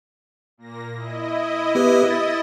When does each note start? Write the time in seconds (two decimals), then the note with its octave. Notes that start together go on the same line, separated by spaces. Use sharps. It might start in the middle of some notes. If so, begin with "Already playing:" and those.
0.58 A#2 A#3 A#6
0.93 E4 D#5
1.75 B3 G4 B4
2.10 A6